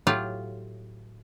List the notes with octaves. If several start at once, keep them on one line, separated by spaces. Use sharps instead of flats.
A2 F#3 F4 G4 F5